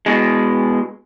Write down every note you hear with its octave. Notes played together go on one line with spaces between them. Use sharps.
B2 G#3